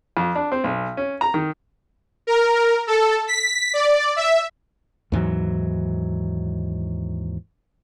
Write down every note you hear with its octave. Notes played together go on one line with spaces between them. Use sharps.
F2
D4
C4
B1
C#4
A#5
D#3
A#4
A4
B6
D5
E5
D#2 G#2 E3 F#3